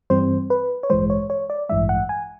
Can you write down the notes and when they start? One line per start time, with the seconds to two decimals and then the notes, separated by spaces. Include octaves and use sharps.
0.10 G2 E3 G3 C4 C5
0.50 B4
0.83 C#5
0.90 A1 G2 E3 G#3 C5
1.10 C#5
1.30 C#5
1.50 D5
1.69 A1 G2 E3 G#3 E5
1.89 F#5
2.09 G#5